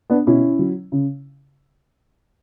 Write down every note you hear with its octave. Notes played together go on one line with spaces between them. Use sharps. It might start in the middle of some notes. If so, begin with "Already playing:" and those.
B3 D4
B2 C#4 E4
F#3
C#3